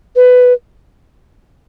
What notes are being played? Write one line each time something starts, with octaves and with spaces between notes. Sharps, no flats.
B4